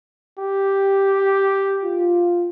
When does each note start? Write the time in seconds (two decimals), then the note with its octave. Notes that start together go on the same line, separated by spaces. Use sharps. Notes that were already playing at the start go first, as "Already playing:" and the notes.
0.39 G4
1.83 F4